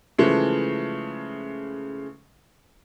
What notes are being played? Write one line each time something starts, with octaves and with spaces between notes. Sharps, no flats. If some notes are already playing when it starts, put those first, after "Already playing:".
C#3 E3 F3 G#3 A3